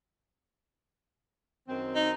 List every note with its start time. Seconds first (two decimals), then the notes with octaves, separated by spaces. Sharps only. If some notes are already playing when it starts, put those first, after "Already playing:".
1.68 F#2 D#3 C4
1.95 D#4